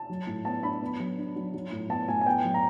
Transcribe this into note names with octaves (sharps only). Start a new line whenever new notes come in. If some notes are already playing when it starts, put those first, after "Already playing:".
Already playing: A5
F#3
A2
B3 A5
D4 B5
B3
F#3
D4
F#3
F#3
A2
B3 A5
A2 G#5
G#5
B3 G5
F#3
A#5